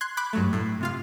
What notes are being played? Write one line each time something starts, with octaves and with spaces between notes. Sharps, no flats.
C6 F#6 G#6
B5 D6 F#6 G6 B6
G2 F#3 A3
A2
C3 F4 F5